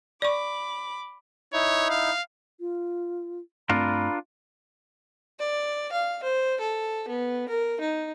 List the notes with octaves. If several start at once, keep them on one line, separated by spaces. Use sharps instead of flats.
D5 B5 C#6 D6
D#4 E4 C#5
F5
F4
G2 A3 C4 D4 F4 A#4 B5
D5
F5
C5
A4
B3
A#4
D#4